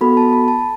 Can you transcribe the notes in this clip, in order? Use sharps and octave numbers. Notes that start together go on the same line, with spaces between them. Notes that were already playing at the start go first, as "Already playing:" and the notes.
B3 F#4 A4 B5
A5
B5
A5